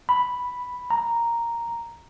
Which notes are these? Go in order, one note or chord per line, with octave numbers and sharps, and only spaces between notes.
B5
A#5